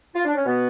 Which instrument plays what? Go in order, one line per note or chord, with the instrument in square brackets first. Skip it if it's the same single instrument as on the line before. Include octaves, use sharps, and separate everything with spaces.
[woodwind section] F4
D4
C#4
B2 B3